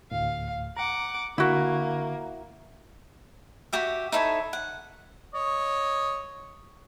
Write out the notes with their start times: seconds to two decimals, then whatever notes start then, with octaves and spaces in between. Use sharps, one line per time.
0.11 D2 A2 F5
0.77 F#5 A#5 D6
1.38 D3 A#3 E4 F#4
3.73 F#4 G4 E5
4.12 D#4 E4 A4 C#5
4.53 F#5
5.34 C#5 D#5